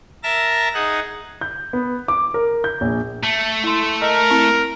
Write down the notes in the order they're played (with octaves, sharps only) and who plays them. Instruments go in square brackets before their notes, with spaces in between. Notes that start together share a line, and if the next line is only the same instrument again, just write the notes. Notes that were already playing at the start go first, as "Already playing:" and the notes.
[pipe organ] A#4 E5 A5 A#6
D#4 G#4 F#5
[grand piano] G6
B3
D6
A#4
G6
A#1
[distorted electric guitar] A3
[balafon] E4 C6
[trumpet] A#4 [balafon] D#5
[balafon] C4 E4